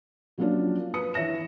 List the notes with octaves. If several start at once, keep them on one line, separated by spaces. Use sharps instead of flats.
F3 F#3 A#3 C#4 D4 F4
B4 D#6 C#7
E3 C#5 E5 A#6 E7